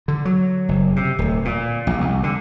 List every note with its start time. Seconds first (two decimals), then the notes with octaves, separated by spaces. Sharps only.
0.08 D3
0.25 F#3
0.69 F#1
0.96 C3
1.19 D1
1.45 A#2
1.87 A#1
2.01 C2
2.23 D3